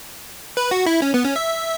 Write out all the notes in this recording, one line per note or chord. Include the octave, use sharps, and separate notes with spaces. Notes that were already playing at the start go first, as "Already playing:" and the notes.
B4
F#4
E4
C#4
B3
C#4
E5